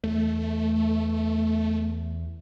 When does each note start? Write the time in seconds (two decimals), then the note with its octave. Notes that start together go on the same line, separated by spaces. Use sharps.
0.04 E2 A3